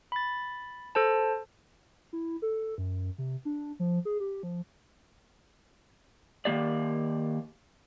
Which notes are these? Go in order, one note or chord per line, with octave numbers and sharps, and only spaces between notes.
B5 A6
A4 C5 A5
E4
A4
F#2
C3
D4
F3
G#4
G4
F3
D#3 F3 A#3 G4 D5